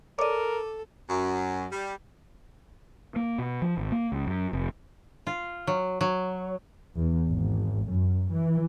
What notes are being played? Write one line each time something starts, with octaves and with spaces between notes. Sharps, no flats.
A4 A#4 C#5 D5 D6 D#7
F#2
G3
A#3
B2
F3
G#1
A#3
C#2
F#2
F1
F4
F#3
F#3
E2
G#1
F#2
E3